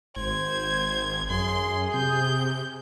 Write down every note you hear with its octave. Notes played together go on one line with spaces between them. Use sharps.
G#1 C5 G#6
F#2 G#4 C6
C3 G6